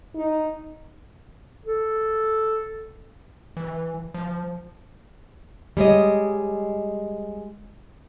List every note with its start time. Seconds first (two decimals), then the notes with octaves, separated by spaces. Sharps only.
0.15 D#4
1.65 A4
3.57 E3
4.14 F3
5.77 G3 G#3 C#5 D#5